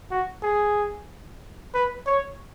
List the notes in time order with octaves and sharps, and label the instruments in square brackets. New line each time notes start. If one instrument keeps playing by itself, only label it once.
[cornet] F#4
G#4
B4
C#5